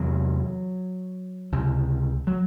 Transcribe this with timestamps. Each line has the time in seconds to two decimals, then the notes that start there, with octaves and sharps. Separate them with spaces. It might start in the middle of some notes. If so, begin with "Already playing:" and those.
Already playing: E2 C3 F#3
1.52 C#2 C3
2.27 F#3